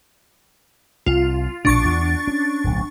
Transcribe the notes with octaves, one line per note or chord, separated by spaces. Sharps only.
C2 F4
A#1 B2 D4 C#6 A6
E2
C#4
D1 B1